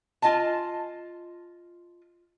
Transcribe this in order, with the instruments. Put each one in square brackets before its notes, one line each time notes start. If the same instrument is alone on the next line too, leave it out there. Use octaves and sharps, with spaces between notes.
[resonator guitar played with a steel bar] F4 D#5 G#5 A5